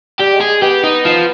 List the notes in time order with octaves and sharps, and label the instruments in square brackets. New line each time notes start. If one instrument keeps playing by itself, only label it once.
[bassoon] G3 [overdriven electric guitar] G4
[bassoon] G#3
[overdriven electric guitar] G#4
[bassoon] G#3
[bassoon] B3 [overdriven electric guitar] G4
[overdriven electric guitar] D#4
F3